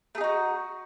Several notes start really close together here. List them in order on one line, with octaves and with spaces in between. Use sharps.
A3 G#4 D#4 F#4